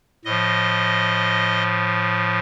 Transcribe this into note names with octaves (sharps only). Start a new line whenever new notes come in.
A2 F3 D#5